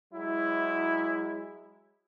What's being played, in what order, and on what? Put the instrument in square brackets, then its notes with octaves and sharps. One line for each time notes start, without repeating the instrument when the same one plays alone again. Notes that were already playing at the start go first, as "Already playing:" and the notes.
[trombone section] F#3 G#3 E4